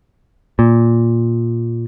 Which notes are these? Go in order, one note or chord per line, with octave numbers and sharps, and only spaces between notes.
A#2